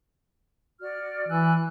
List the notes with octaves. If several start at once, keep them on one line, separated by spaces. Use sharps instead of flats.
F#4 D5 F6
E3 G#5 E6 F#6